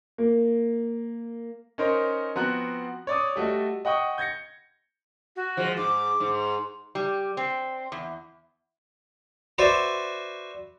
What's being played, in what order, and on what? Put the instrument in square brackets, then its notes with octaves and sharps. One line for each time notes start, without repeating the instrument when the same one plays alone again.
[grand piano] A#3
C#4 D#4 A#4 C5 C#5
F3 B3 C4 F#4 A#5 F#6
C#5 D5 D6 D#6
G3 A3 F#4 D#5
D#5 F#5 G5 C#6 D#6
G6 G#6 A#6 C#7
[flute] F#4
[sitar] F3 G#3
[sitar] G#2 [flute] D6
[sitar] G#2
[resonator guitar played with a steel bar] G3
C4
E2
[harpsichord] F#4 B4 C5 D5 E5